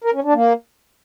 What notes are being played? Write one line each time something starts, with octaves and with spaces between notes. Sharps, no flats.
A#4
C#4
D4
A#3